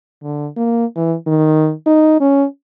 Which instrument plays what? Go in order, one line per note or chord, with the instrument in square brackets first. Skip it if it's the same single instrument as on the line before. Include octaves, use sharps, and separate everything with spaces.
[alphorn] D3
A#3
E3
D#3
D#4
C#4